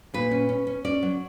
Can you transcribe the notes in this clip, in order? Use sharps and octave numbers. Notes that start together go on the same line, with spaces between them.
A#2 B4
C#4
C#4
C#4
C#4 D5
F#3